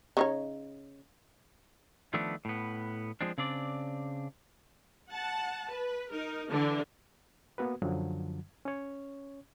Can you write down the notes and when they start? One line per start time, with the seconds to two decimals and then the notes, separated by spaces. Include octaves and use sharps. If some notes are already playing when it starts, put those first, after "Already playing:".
0.17 C#3 D#4 C#5
2.14 D#3 F3 A3 B3 D4
2.45 A2 B3
3.21 F3 G#3 C4 D4
3.38 C#3 C4 D4 D5
5.12 F#5 A5
5.72 B4
6.13 D#4 A#4
6.51 D3 E3 D4
7.58 A#3 B3 F#4 B4
7.82 F#2 D3 F3 F#3
8.65 C#4 C#5